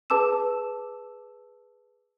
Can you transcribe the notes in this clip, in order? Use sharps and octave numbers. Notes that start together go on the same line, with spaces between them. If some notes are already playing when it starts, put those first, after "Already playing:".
G#4 B4 A5 D6 E6 E7